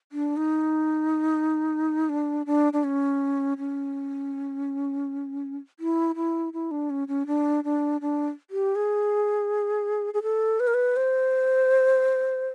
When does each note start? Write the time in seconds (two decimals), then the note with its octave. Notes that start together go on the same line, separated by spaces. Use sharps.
0.12 D4
0.37 D#4
2.09 D4
2.46 D4
2.73 D4
2.84 C#4
3.58 C#4
5.80 E4
6.16 E4
6.53 E4
6.71 D4
6.90 C#4
7.08 C#4
7.27 D4
7.64 D4
8.01 D4
8.50 G4
8.75 G#4
10.14 G#4
10.23 A4
10.60 B4
10.67 A#4
10.74 B4
10.96 C5